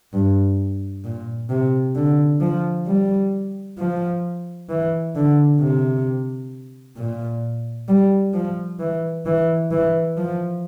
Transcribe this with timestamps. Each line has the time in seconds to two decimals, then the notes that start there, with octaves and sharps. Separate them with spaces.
0.13 G2
1.04 A#2
1.50 C3
1.96 D3
2.41 F3
2.87 G3
3.78 F3
4.70 E3
5.15 D3
5.61 C3
6.97 A#2
7.89 G3
8.34 F3
8.80 E3
9.26 E3
9.71 E3
10.17 F3